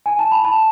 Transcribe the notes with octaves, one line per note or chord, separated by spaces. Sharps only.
G#5
A5
B5
A5